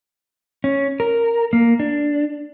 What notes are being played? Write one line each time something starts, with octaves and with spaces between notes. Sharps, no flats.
C#4
A#4
A#3
D4